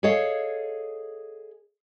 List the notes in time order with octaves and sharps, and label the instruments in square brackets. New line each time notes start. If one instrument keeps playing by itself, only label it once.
[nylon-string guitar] G#4 A4 C#5 D#5 F5